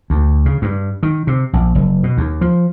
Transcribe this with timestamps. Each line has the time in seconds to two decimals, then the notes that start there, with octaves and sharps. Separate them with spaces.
0.10 D2
0.46 C#3
0.62 G2
1.03 D#3
1.27 C3
1.53 A#1
1.75 F#1
2.03 B2
2.17 D#2
2.41 F3